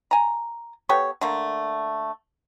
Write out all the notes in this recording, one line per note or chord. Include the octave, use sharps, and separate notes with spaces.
G#5 A#5
B3 G4 A4 C#5
D3 A3 A#3